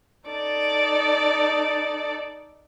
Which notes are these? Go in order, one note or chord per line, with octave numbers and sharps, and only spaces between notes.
D#4 A4 D5